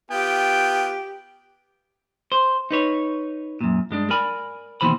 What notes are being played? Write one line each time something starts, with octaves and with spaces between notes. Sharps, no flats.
B3 F4 G4 G5
C5
D#4 B4 C#5
F#2 A#2
G2 G#3 D4
A#4 D5 G#5 B5
D#2 B2 E3 C5 B5